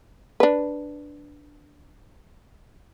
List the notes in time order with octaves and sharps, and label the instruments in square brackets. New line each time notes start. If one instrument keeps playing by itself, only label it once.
[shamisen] D4 B4